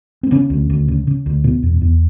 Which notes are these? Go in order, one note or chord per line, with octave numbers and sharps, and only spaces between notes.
C4
C#3 B3 C#4
D2
D2
C#3
C#3
D2
B2
E2
E2